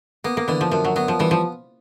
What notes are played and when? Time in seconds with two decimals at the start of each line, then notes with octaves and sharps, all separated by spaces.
0.24 A#3 B3
0.37 A#3
0.48 D3 E3
0.61 F3
0.71 F#2 F3
0.85 F#3
0.96 F#3 B3
1.08 F3
1.19 E3 G3
1.31 F3